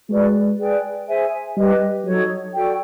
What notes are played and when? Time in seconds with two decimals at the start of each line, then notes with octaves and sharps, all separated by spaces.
0.09 G#3 F#4 B4 D5
0.58 G#4 B4 D5 G5
1.08 G#4 C5 E5 G#5
1.57 G3 G4 B4 D#5
2.05 F#3 D#4 F#4 A4 C#5
2.55 F#4 A4 D5 G5